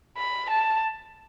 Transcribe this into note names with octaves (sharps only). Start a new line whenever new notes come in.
B5
A5